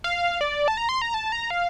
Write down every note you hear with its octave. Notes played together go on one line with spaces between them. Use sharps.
F5
D5
A5
A#5
C6
A#5
A5
A#5
F5